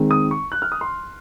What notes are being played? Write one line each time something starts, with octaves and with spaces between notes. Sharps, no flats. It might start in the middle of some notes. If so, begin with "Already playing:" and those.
Already playing: D#3 G#3 C4
D#6
C#6
F#6
F6
D#6
C6